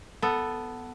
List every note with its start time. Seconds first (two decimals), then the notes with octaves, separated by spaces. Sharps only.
0.22 B3 A4